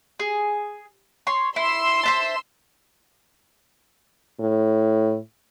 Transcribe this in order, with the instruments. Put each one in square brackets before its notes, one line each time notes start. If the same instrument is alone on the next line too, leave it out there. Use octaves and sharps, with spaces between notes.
[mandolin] G#4
C#5 C6
[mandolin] E4 [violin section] C6 E6
[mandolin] C5 E5 A5
[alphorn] A2